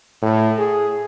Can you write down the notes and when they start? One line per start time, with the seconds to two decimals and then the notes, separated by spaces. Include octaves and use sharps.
0.22 A2
0.59 G#4